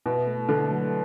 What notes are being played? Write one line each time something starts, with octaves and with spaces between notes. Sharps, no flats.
B2 E4
A3
D3 A4
F#3